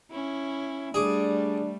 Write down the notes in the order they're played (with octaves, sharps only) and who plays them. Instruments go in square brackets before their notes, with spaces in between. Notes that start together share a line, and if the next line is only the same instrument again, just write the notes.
[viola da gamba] C#4 E4
[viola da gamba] G3 A3 [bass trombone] D4 [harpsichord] G#4 D6